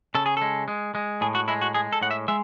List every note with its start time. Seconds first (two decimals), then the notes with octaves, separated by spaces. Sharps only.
0.15 C#3 A4
0.26 G#4
0.37 G#3 A4
0.68 G#3
0.95 G#3
1.21 A2 G#4
1.35 F#4
1.48 G#3 E4
1.61 F#4
1.74 G#3 G#4
1.93 A4
2.01 A2 F#5
2.11 E5
2.28 G#3 E5